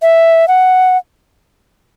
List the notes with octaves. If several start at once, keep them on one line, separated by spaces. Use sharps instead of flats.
E5
F#5